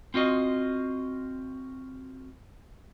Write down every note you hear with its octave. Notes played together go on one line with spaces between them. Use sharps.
C4 F4 F#4 D#5